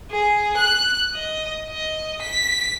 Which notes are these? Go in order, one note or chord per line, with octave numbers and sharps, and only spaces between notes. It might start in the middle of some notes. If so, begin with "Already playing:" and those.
G#4
F#6
D#5
D#5
B6